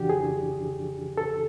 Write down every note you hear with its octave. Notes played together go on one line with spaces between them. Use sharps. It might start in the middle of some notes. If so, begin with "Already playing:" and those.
Already playing: F2 C#3 E3 D4 F#4 G4
G#4
A4